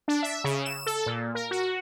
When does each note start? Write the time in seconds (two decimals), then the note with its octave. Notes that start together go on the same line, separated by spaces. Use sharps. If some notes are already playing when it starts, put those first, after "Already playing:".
0.08 D4
0.23 E5
0.44 C#3
0.65 E7
0.86 A4
1.06 A#2
1.35 A#4
1.51 F#4